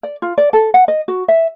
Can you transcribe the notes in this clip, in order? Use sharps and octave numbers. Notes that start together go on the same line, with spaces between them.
D5
F4
D5
A4
F#5
D#5
F#4
E5